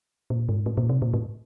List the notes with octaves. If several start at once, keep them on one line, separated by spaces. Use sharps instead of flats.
A#2
G#2
A2
A#2
C3
A#2
A2